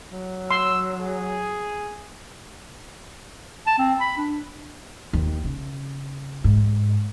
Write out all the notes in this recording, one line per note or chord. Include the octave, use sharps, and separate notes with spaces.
F#3
C6 E6
G#4
A5
C4
B5
D4
D#2
C#3
G#2